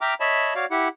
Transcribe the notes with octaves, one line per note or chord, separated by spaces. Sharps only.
E5 G5 A#5 D6 F6
C#5 D#5 E5 A5 B5
F#4 C#5 D5 F5
E4 G4 F#5